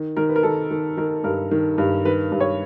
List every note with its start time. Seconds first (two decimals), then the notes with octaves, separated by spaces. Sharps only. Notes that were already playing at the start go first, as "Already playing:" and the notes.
Already playing: D#3
0.17 D#3 A#4
0.29 B4
0.36 A#4
0.43 D#3 A4
0.71 D#3
0.97 D#3 A#4
1.24 G2 A#4
1.51 D#3
1.78 G2
2.05 D#3 B4
2.32 G2
2.40 C#5